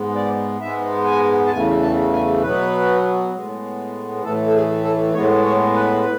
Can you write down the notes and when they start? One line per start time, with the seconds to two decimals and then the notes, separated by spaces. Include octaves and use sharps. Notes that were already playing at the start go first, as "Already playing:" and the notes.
Already playing: G#2 G#3 B3
0.15 D5
0.61 G#2 G#3 B3 E5
1.07 G#5
1.46 A5
1.52 E2 C#3 E3 A3 G#5
1.82 A5
2.13 G#5
2.42 B2 F#3 B3 B4
3.34 A2 G#3 B3
4.23 A2 E3 A3 A4
4.47 A4
4.54 G#4
4.84 A4
5.14 A2 G#3 B3 C#5
5.44 C#5
5.75 B4